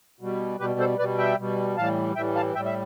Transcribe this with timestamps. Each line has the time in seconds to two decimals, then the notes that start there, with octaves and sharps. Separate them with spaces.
0.20 B2 G3
0.60 B2 G3 G4 B4
0.79 A4 C5
0.99 B2 G3 B4 D5
1.18 E5 G5
1.38 B2 G3
1.77 A2 E3 G3 F5 A5
2.16 A2 E3 G3 E5 G5
2.35 F5 A5
2.55 A2 E5 G5
2.58 G3
2.65 E5